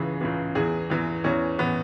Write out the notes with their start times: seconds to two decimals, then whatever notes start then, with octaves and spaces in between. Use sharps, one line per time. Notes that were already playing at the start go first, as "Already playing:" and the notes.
Already playing: C#2 C#3 E3 G#4
0.21 C#2 C#3 E3
0.55 E2 E3 G#4
0.90 E2 E3
1.24 E2 E3 C#4
1.59 E3 B3